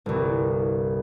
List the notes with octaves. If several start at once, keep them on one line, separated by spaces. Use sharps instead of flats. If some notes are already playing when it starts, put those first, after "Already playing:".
G1 C2